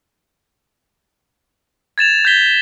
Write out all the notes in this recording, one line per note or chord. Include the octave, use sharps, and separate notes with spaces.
G#6 A6 E7 F7
G6 G#6 B6 G7